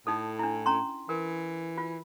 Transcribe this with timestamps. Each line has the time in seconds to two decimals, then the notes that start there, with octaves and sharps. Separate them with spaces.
0.07 A2 D#4 A4
0.39 D4 E4
0.66 C#4 A#5 C6
1.09 E3 A#4
1.78 F4